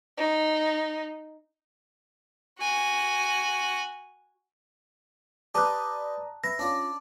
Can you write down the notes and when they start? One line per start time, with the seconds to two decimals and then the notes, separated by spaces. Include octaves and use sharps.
0.17 D#4
2.60 F#4 G#5
5.55 G4 B4 D5 A5 A#5 D#6 F#6
6.44 B4 E5 A#6
6.59 C#4 D4 F4 D5